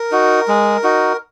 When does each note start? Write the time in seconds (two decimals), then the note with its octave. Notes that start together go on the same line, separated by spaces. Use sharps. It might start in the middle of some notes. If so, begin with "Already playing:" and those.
Already playing: A#4
0.12 D#4 F#4
0.48 G#3
0.84 D#4 F#4